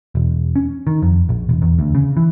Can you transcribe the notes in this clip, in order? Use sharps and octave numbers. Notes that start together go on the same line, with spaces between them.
E1
C#4
D#3
F2
A#1
E1
E2
D2
C#3
E3